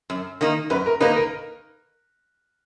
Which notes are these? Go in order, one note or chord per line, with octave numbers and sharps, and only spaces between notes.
F#2
D#3 A#3 D#4
F#2 B4
A#4
D#3 A#3 D#4 B4
A#4